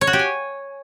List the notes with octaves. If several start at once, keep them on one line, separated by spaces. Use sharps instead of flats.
C#5
F#4
G4
G#5